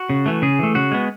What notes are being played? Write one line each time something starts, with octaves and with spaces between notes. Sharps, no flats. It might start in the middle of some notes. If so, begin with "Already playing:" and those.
Already playing: F#4
C#3
E3 A3
C#3 G#4
E3 A3
C#3 F#4
G#3 B3